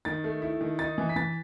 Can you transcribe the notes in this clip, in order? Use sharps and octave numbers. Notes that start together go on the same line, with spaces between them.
D#3 A6
A3
E4
D#3
D#4 A6
E3
B6
E3 A6